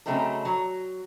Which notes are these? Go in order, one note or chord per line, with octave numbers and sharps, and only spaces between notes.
C#3 F#3 A3 C4 D#4 A4
F#3